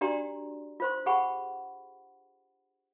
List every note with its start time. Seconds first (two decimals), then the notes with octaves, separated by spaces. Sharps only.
0.01 D4 F#4 G4 D5 A#5 C6
0.80 F4 C5 C6
1.06 G4 G#4 F#5 G#5 B5 C#6